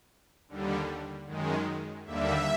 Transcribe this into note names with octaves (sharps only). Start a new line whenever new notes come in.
D#2 D3 G3
F#2 D#3 G#3
D#2 D3 G3 A#3 E5